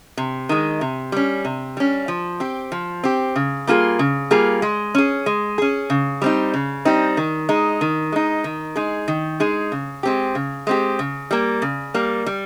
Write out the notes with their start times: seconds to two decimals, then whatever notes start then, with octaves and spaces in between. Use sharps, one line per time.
0.17 C3
0.49 D#3 G#3
0.81 C3
1.12 G3 C#4
1.45 C3
1.77 G3 C#4
2.08 F3
2.40 C4 G4
2.72 F3
3.04 C4 G4
3.36 C#3
3.67 G3 A#3 F4 G#4
3.99 C#3
4.31 G3 A#3 F4 G#4
4.62 G#3
4.95 C#4 G#4
5.26 G#3
5.58 C#4 G#4
5.90 C#3
6.22 G3 C4 D#4
6.54 C#3
6.85 G3 C4 D#4
7.17 D#3
7.49 G#3 D#4
7.81 D#3
8.12 G#3 D#4
8.44 D#3
8.76 G#3 D#4 G#4
9.08 D#3
9.40 G#3 D#4 G#4
9.72 C#3
10.03 G#3 C4 G4
10.35 C#3
10.67 G#3 C4 G4
10.99 C#3
11.31 G3 A#3
11.62 C#3
11.94 G3 A#3
12.26 G3